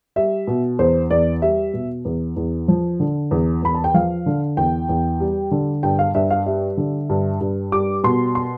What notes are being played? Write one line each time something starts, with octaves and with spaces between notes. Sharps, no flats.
G3 E5
B2
E2 C5
E2 D5
G3 E5
B2
E2
E2
F3
D3
E2
E2 B5
A5
G5
F3 F5
D3
E2 G5
E2
G3
D3
G2 G5
F5
G2 E5
F5
G3 E5
D3
G2
G2
G3 D6
B2 C6
C6